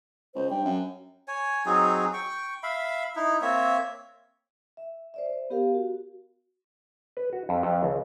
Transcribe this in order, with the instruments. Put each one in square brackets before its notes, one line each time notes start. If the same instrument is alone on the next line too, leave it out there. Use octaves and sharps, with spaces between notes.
[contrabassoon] C#2 [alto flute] C5
[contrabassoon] G2 [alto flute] G5
[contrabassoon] F#2
[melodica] C#5 G#5
F#3 C4 D#4 G#4
G5 C#6
E5 F5 B5
D#4 E4
A#3 C4 C#5 E5
[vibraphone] E5
C5 D5 E5
C5
B3 G4 A#4 F5
F#4
[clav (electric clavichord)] B4
F#4
F2
F2
C#2